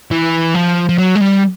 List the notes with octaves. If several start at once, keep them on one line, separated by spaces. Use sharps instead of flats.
E3
F3
F3
F#3
G#3
G3